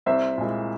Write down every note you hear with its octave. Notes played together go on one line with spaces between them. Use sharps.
C2 C5 E5
A#2 G#3 E4